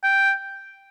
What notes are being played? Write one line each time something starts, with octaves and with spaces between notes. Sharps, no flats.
G5